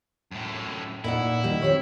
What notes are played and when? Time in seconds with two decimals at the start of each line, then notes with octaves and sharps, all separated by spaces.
0.32 F#2 A2
1.04 A#2 D#4 E4 F#5
1.44 D#3 G3 G4
1.62 C4 G4 C#5